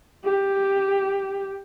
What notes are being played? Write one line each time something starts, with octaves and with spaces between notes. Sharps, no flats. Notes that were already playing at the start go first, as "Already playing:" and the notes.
G4